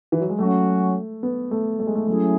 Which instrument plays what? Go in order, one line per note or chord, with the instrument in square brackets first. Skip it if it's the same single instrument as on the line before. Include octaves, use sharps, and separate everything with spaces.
[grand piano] E3
F#3
G#3
[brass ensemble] F#3 C#4 F#4 [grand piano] A3
[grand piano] B3
A3
A3
G#3
A3
[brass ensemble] F#3 C#4 E4 G#4 [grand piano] A3